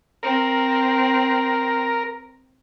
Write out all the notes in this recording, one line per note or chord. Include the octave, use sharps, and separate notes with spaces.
C4 A#4